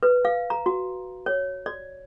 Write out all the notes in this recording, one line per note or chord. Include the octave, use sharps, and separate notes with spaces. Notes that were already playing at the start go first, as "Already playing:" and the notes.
B4
F5
A#5
F#4
C#5
D5